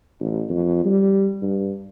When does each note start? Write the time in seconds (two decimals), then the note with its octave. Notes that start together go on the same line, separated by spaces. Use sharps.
0.20 A1
0.49 F2
0.85 G3
1.42 G2